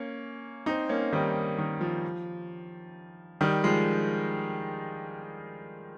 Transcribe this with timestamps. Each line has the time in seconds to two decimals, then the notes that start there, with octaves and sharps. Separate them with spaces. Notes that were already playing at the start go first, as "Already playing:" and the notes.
Already playing: A#3 C#4
0.66 C4 D#4
0.89 A#3 C#4
1.13 D#3 G3
1.58 D#3
1.81 F3
3.41 D#3 G3
3.64 F3 G#3